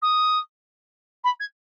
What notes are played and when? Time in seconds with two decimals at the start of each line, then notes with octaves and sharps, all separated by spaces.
0.02 D#6
1.24 B5
1.40 G#6